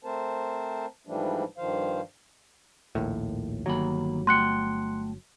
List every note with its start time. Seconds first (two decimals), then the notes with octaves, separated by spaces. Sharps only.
0.04 A3 C4 A#4 C5 A5
1.07 G#2 E3 F3 G3 A3 D4
1.58 G2 D#3 F3 C5 F5
2.95 A#1 D#2 A2
3.66 G1 D#3 F#3 A#3 B5
4.27 A3 F#5 G5 C6 F#6 C#7